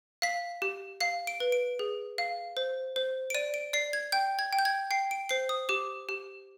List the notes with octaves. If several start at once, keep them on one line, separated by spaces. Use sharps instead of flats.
F5 B6
G4
F5 C7
D7
B4
D7
G#4
F5
C5
C5
D7
D5 D#7
D7
D5 C7
G#6
G5 G6
G#6
G5
G6
G#6
G5 C7
D7
C5 C7
D#6
G4 D6
G4